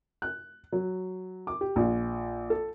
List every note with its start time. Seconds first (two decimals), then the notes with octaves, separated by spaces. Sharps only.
0.22 F#6
0.72 F#3
1.47 D6
1.61 G4
1.76 A#1
2.50 A4